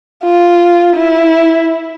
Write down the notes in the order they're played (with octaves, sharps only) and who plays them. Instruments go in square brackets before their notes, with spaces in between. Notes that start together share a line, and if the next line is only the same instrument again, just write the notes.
[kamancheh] F4
E4